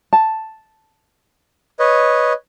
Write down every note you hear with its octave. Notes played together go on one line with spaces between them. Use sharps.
A5
B4 C#5 D#5